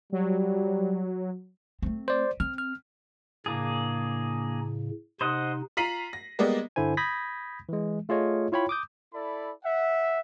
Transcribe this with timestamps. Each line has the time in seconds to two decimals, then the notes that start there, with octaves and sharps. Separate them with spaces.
0.12 F#3 G3
1.82 A3 C4
2.08 C5 D5
2.40 C4 F6
2.58 F6
3.46 A2 C#3 A#3 D4 G#4
5.21 C3 D#4 C5 D#5 F#5
5.77 F4 A#5 B6 C7 D#7 F#7
6.13 A#6
6.39 G3 G#3 A#3 B3 D5 D#5
6.76 G2 D3 E4 C5 G#5
6.97 B5 D#6 G6 G#6 A#6 B6
7.69 E3 G#3
8.09 A3 F4 G#4 C#5 D#5
8.52 E4 F4 C#5 G5 B5
8.69 D6 D#6 G6
9.13 E4 A4 D5 B5
9.64 E5 F#5